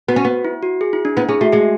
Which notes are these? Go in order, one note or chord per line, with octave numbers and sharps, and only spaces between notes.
B3 F#4
C#4
B3
E4
F#4
G#4
E4
D4
B3 E4
C#4 G#4
A3 F#4
G#3 G#4